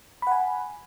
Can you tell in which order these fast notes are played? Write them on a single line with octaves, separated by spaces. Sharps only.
B5 F#5 G#5